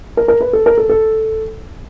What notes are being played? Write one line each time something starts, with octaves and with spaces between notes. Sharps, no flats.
A#4
A#4
B4
A4
A#4
A4
A4